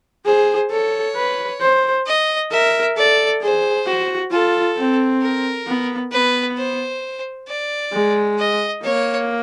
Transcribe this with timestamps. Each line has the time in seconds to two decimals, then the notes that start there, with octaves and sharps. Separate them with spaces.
0.25 G#4 C5
0.71 A4 C#5
1.16 B4
1.61 C5
2.06 D#5
2.52 A#4 E5
2.97 A4 D5
3.42 G#4 C5
3.87 F#4
4.31 F4 A4
4.77 C4
5.22 A#4
5.67 B3
6.12 B3 B4
6.58 C5
7.48 D5
7.93 G#3
8.38 D#5
8.83 A#3 C#5